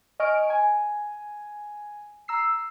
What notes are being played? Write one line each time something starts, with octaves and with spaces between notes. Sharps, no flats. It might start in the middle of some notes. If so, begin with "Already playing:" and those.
D#5 G#5 C#6 F6 D7
G#5
A#5 E6 C7